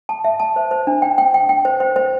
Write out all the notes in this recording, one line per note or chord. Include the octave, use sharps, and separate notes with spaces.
A5
E5
A5
C5
C5
D4
G5
G5
G5
G5
C5
C5
C5